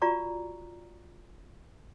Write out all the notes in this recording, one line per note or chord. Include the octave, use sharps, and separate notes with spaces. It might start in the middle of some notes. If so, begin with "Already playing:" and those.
F4 F#4 D5 A#5 C#6